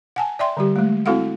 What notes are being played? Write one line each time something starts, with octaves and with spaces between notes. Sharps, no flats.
F#5 G#5 A5
D5 E5 G5 C6
D3 G3 G4
G#3 A3
C4 E4 F#4 A4 F5 F#5